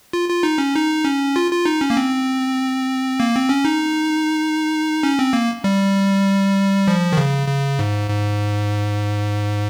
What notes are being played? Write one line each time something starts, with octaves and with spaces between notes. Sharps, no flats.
F4
F4
D#4
C#4
D#4
C#4
F4
F4
D#4
C#4
A#3
C4
A#3
C4
C#4
D#4
C#4
C4
A#3
G3
F3
D#3
C#3
C#3
G#2
G#2